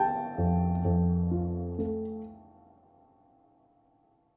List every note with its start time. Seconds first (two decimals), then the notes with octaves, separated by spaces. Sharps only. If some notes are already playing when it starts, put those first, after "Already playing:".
Already playing: G4 G5 A5
0.38 F2
0.85 F2
1.31 F4
1.79 A3